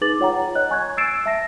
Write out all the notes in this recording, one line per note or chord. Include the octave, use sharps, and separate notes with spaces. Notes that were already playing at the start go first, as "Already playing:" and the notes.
D#4 G#4 B4 D6 A6 F#7
F4 C#5 F#5 G5 A#5
C#5 D#5 F#6
G#5 C#6 F#6 G#6
E6 G#6 A6 C7 D7 E7
E5 A5 A#6